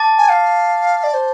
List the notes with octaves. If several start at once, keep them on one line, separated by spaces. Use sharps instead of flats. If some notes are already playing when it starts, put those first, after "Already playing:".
Already playing: A5 D6 A6
G#5
F5
D5
C5